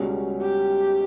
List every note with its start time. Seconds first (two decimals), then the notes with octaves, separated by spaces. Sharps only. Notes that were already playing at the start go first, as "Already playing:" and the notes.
Already playing: C#2 B2 G3 C#4
0.42 G4